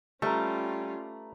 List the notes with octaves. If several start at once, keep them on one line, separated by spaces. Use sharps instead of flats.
G3 A3 C#4 F4 B4 A#5